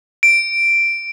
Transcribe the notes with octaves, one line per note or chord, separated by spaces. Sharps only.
D7